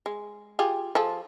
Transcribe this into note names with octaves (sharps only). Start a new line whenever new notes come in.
G#3
F4 G4 G#4
F3 G#4 A4